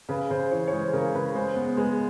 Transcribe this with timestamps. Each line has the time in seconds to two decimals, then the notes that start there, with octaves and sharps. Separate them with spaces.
0.09 C#3 B4
0.30 C#3 C5
0.51 E3 C#5
0.67 C#5
0.72 G#3 C5
0.93 C#3 A#4
1.14 C#3 B4
1.35 G#3 C5
1.56 B3 B4
1.77 G#3 B4